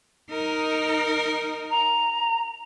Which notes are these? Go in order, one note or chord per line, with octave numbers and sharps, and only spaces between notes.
D#4 A#4
A#5